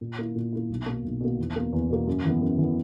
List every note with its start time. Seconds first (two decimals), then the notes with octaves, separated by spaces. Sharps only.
0.01 A#2
0.19 A#3 E4
0.35 A#2
0.53 A#3 E4
0.70 B1
0.86 B2 A#3
1.04 B1
1.21 B2 A#3
1.38 E2
1.56 B2 A#3
1.73 E2
1.90 B2 A#3
2.07 F#2
2.25 E3 B3
2.41 F#2
2.58 E3 B3